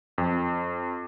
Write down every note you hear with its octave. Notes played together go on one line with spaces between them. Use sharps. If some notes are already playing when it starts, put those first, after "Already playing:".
F2